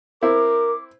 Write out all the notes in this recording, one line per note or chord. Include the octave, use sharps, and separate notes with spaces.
C4 E4 A#4 D6